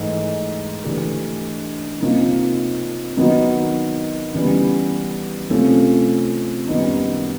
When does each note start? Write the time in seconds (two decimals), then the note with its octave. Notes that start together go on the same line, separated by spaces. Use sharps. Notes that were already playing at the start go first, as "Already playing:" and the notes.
Already playing: G#2 E3 A3
0.84 E3 A3 D4 G4
2.00 C3 F3 A#3 D#4
3.17 D#3 F#3 B3 D#4 F#4
4.33 C#3 E3 G3 B3
5.50 C3 F3 A3 C#4
6.67 F#2 D#3 G3 B3 D#4